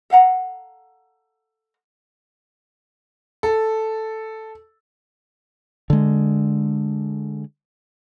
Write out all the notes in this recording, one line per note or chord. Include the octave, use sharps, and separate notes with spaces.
A4 F5 F#5 A#5
A4
D3 G#3